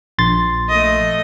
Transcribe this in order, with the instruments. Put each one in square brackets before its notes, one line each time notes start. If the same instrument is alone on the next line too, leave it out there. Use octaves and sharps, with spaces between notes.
[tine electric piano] A#1 C6 A6
[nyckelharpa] A3 D#5